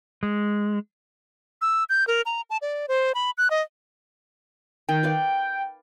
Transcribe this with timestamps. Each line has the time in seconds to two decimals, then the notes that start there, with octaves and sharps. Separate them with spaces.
0.23 G#3
1.61 E6
1.89 G6
2.07 A#4
2.26 A#5
2.50 A5
2.62 D5
2.88 C5
3.15 B5
3.38 F#6
3.50 D#5
4.89 D#3 G5
5.03 B4 D5 F5